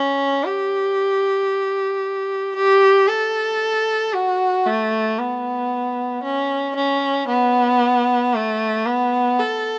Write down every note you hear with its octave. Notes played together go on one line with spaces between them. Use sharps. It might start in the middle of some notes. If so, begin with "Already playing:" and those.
Already playing: C#4
G4
G4
A4
F#4
A3
B3
C#4
C#4
B3
A3
B3
A4